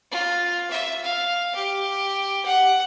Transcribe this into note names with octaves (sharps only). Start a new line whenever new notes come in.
F4
E5
F5
G4
F#5